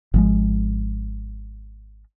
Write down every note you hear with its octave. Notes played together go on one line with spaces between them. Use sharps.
G#1 F3 G#3